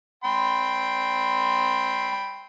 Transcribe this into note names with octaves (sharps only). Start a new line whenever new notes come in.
G5 B5 C6